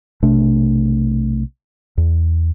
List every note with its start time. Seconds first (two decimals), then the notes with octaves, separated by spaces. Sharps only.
0.23 B1 C3 A3 D4
1.98 E2